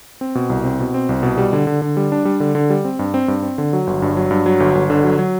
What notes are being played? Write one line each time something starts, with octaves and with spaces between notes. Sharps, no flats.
C4
B2
C2
C4
B2
C4
C2
B2
G3
D3
D3
D3
G3
D4
G3
D3
D3
G3
C4
G2
C4
G2
C4
D3
F#3
G1
G2
F#3
G2
F#3
G1
G1
D3
F#3
F#3